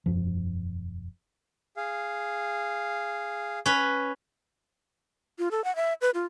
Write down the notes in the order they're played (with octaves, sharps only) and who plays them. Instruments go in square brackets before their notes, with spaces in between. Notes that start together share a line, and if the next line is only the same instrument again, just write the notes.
[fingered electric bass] E1 F#2 F3
[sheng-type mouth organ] G#4 F5
[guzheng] C#4 B4
[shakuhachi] F4
A4
F#5
E5
B4
F4